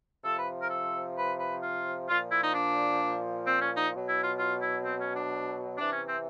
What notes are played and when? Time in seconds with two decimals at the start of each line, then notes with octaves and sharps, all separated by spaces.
0.23 C3 F3 A4
0.39 B4
0.61 A#4
0.70 A4
1.17 B4
1.40 B4
1.63 F4
2.08 A#2 F3 F4
2.32 E4
2.43 D#4
2.54 D4
3.47 C4
3.61 C#4
3.77 D#4
3.92 B2 F#3
4.08 E4
4.23 F4
4.39 F4
4.62 E4
4.85 C4
5.01 C#4
5.16 D4
5.78 C3 E3 D4
5.92 C#4
6.08 C4